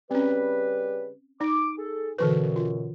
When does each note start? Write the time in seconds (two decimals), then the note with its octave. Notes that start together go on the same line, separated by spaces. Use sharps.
0.11 C#3 G3 C4 C#4 B4
1.41 D#4 D6
1.77 G#4 A4
2.18 F#2 B2 D3 E3 B4
2.56 F4